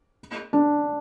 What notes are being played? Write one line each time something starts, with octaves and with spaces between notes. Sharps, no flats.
D4